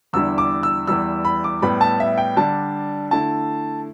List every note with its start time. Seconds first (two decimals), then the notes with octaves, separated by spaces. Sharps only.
0.13 E2 D3 G3 E4 E6
0.38 D6
0.63 E6
0.87 E2 E3 G3 E6
1.25 B5
1.44 D6
1.62 A2 G3 B3 B5
1.81 A5
2.00 E5
2.18 G5
2.36 D3 G3 D4 A5
3.11 D3 A3 E4 A5